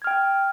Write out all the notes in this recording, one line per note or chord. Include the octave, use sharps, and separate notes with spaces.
G5 F6 G#6